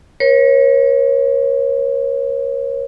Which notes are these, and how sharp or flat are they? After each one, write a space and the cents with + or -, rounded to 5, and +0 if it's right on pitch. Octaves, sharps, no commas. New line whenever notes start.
A#4 +40 C#5 -25